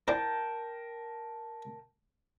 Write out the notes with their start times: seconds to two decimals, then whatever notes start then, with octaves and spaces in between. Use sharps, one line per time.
0.08 D4 E4 A#4 C5 G5 A5